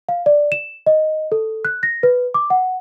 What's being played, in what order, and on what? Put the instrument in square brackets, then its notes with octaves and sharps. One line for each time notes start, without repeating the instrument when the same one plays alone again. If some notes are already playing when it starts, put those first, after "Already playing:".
[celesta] F5
D5
E7
D#5
A4
F#6
A#6
B4
D6
F#5